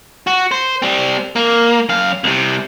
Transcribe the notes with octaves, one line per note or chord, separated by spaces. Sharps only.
F#4
C5
G3 C4
A#3
F#2 F5
C2 C3